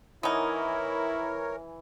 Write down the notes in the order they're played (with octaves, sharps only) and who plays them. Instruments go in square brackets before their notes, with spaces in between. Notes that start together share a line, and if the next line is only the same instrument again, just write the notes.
[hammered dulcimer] E3 G#5 [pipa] B3 D#4 [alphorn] E4 [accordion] A#4 C#5